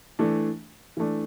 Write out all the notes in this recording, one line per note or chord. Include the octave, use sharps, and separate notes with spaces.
E3 A3 D4
E3 A3 D4